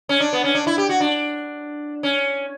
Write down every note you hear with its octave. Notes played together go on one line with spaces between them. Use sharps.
C#4
D4
B3
C#4
D4
E4
G4
F#4
D4
C#4